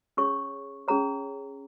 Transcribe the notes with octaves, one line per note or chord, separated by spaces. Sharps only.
C#4 G#4 C#5 C#6
C#4 G#4 C#5 A#5